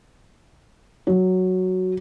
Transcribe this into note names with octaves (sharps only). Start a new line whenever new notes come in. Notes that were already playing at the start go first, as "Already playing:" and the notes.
F#3